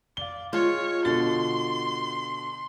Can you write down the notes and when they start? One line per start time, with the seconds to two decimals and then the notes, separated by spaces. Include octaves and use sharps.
0.17 D5 F5 G7
0.53 G#3 F4 C#5
1.05 B2 D3 C6 A6